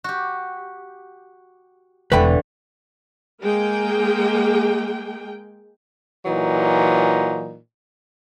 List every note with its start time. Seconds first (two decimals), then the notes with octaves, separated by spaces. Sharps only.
0.04 F#4 G4
2.12 E1 D3 E3 A3 B4 G5 B5
3.41 G#3 A#3 G#4 G5
6.26 A#2 E3 F#3 D#4